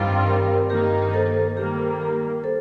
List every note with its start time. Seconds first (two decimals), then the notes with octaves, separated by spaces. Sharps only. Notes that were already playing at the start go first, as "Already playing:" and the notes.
Already playing: G2 D#3 G3 C4 F4
0.27 G4 A#4
0.69 G2 D#3 A#3 D#4 G4 A#4
1.13 A4 C5
1.57 D#3 G3 A#3 G4 A#4
2.01 G4 A#4
2.44 A4 C5